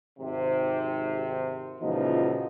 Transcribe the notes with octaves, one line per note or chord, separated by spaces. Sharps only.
G#1 C3
C#2 A#2 E3 F3 D#4 F#4